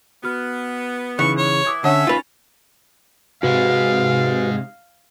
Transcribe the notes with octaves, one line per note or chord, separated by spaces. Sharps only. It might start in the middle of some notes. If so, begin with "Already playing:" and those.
B3 F#4 F6
C#3 E3 D#4 C#6 F#6
C#5
E3 E4 D6 D#6 G#6
D3 C#4 C#5 E5 F#5
D#4 F4 B4 A6 F7
G#2 C3 G#3 F#4 B4 F5